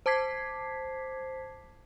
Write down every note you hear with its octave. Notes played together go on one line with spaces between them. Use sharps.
C5 A5 D6 G#6 B6 C7